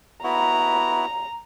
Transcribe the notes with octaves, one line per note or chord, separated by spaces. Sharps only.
B3 E4 F#4 A#5